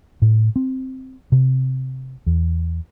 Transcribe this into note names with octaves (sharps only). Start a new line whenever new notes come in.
A2
C4
C3
E2